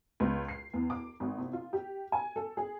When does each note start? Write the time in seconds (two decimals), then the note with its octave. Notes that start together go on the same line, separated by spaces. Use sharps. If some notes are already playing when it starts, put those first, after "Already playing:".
0.20 C#2
0.48 C7
0.74 E2
0.90 D6
1.20 G#1
1.38 C3
1.53 F4
1.73 G4
2.12 G#5
2.36 A4
2.57 G#4